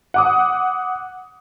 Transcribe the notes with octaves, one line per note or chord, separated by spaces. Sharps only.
F#5 D6 D#6